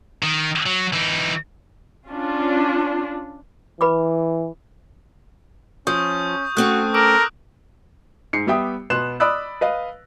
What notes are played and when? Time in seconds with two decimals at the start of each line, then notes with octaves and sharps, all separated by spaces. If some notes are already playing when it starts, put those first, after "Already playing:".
0.23 D#3
0.66 F#3
0.93 E3 D#4
2.09 C#4 D4 F4
3.81 E3 B4 B5 D6
5.87 F3 C#4 C#6 D#6 G6
6.57 A3 C4 C#4 F#4 D#6 F#6
6.94 A4 A#4 D6 E6 D7
8.33 G#2 C7 C#7
8.47 G3 B3 G4 E5 G5 D#6
8.90 B2 B3 C6 F#6 E7
9.20 D5 D#5 B5 D#6 E6 F#6
9.61 B4 D#5 F5